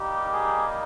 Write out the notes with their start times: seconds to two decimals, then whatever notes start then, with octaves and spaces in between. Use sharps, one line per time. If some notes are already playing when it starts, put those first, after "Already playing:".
Already playing: G3 A#3 D#4 G4
0.33 G#4